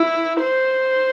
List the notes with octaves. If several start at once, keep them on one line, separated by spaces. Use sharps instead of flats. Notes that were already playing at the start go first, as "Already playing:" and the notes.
Already playing: E4
C5